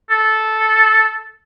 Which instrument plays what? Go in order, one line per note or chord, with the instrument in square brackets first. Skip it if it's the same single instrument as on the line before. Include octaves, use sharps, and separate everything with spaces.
[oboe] A4